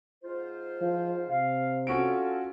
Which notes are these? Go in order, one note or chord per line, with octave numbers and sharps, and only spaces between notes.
G#2 F4 C5
F3
C3 F5
C#4 F4 F#4 A4 D7